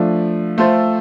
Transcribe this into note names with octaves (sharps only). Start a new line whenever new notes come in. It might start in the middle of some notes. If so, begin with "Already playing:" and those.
Already playing: F3 A3 D4
A3 F4 A4 C5